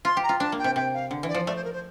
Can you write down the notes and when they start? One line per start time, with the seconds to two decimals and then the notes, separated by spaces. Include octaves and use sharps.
0.05 F4 C6
0.17 G4
0.23 A#5
0.29 F4
0.40 D4 A5
0.52 A#3
0.59 G5
0.64 C3
0.76 C3 G5
0.94 F5
1.11 D3
1.23 E3
1.28 D5
1.34 F3
1.47 A3 D5
1.56 C5
1.64 A#4
1.73 C5